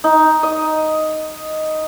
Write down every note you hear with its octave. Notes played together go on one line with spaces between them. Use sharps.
D#4
D#5